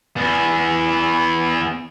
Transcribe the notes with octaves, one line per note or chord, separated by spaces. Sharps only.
E2 B3